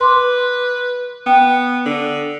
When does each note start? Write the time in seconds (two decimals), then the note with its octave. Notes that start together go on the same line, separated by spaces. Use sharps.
0.01 B4 C6 D6
1.26 B3 G5
1.86 D3